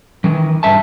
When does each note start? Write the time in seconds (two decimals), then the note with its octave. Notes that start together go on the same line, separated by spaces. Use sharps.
0.24 D#3 E3
0.63 G2 E5 A5